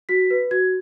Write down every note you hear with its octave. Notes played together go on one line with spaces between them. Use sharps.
F#4 B6
B4
F#4 G#6